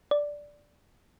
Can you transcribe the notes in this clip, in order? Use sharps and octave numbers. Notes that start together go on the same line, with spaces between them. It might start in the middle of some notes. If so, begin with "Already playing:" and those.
D5